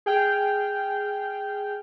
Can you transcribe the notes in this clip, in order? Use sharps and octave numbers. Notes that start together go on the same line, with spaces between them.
G#4 G5 F6